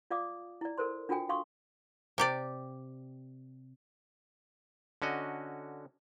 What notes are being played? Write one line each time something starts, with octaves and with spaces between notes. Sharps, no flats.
F4 D5 F5 D6 D#6
E4 D5
A4 A#4 C5 C6
D4 F4 F#4 A4 G5 G#5
F5 C6 C#6 D#6
C3 G4 D5
D3 C#4 F#4 D#5